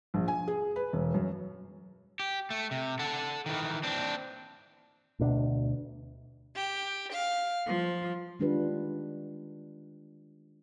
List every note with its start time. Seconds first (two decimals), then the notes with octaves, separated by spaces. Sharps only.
0.14 A#1
0.28 G#5
0.48 G#4
0.76 B4
0.93 E1
1.14 F#2
2.20 G4
2.50 A3
2.71 C3
2.99 A4 F#5
3.46 D#3 E3
3.83 C4 D4
5.20 D2 B2 D4
6.54 G4
7.12 F5
7.66 F3
8.40 D#3 G#3 D4 F4 G4 B4